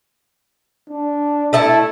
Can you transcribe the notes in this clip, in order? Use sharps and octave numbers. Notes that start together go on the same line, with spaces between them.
D4
A3 E4 A5